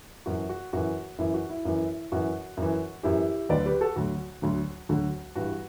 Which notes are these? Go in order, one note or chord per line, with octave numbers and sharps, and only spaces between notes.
F#2 E3 F#4
F#4
F#2 E3 F#4
F#2 E3 E4
F#4
E4
F#2 E3
F#2 E3 F#4
F#2 E3
F#2 E3 E4 G4
D2 D3 F#3 B4 D5
G4 B4
F#4 A4
D2 D3 F#3 F#4
D2 D3 F#3
D2 D3 F#3 F#4
G2 E3 F#4